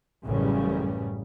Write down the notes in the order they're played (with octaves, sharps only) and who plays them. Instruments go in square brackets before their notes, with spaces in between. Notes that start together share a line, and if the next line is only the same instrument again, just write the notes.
[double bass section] A1 F#2 C#3 G3